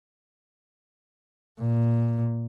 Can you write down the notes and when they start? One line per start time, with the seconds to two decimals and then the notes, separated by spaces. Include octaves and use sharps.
1.61 A#2